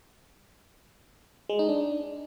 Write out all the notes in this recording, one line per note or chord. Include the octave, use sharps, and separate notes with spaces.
G#3
D#4
D4